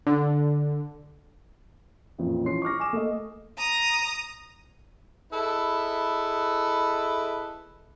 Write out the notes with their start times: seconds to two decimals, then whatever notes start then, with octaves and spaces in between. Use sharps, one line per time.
0.07 D3
2.18 A1 F2 A#2
2.44 E3 F3 C#4 C6 C7
2.62 C#6 D6 F6 A#6
2.80 G#5 D6 D#6 E7
2.93 A3 A#3 A4 D#5
3.58 A#5 D#6
5.32 E4 G#4 A4 B4 D#5